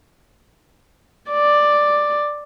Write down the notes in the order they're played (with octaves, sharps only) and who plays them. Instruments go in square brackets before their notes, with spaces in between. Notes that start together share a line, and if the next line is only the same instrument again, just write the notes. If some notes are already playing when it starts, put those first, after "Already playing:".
[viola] D5